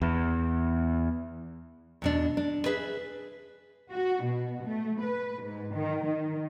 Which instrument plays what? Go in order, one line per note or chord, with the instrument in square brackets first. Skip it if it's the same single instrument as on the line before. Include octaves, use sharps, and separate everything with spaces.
[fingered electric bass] E2
[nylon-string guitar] E2 B2 D4
D4
G#4 B4 E5
[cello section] F#4
B2
A3
B4
G#2
D#3
D#3